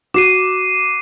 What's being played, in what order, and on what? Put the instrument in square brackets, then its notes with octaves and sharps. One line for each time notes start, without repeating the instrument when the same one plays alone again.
[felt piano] F#4 [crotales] D6 C7 D#7